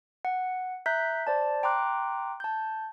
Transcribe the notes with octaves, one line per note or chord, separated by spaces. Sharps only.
F#5
E5 A#5 F#6 G6 B6
C5 D5 A5
G5 A#5 C6 D6 F#6
A5 G6